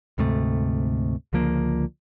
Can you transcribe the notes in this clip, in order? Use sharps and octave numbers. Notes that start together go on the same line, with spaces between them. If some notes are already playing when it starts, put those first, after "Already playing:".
D2 G#2 C3 A3
C#2 D3 F3 A#3